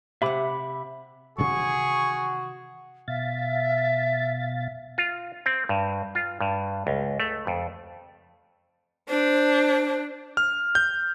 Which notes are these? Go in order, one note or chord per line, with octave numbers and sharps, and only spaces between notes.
C3 E5 F#5 B5 D6
C3 D#3 E3 F#4 G#4 C#6
B2 E5 F5 A6
F4
C4
G2
F4
G2
C#2
A3
F2
D4 C5
F6
G6